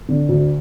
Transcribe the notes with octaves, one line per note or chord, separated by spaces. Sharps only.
D3
D2